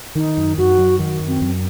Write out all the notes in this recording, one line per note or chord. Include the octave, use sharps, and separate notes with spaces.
D#3 D#4
F#2
F#2 F#4
F#3
D#3
F#2
C4
F#2